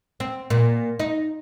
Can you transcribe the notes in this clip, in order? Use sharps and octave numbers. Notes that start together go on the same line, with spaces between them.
C4
A#2
D#4